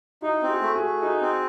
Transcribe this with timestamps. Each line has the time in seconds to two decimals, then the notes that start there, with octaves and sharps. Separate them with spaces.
0.22 D#4 E4 F#4
0.43 C4
0.48 F#4 G#4
0.61 A3
0.76 F#4 G#4
0.83 A3
1.01 D#4 F#4 G#4
1.21 C4